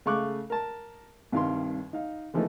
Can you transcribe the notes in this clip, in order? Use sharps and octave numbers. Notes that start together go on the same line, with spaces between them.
C#3 A3 F5 C#6 D6 F#6
A#4 A5
C2 G2 D#3 F5 C6
D#4 F5
C#3 E3 F3 A3 A#3 D#4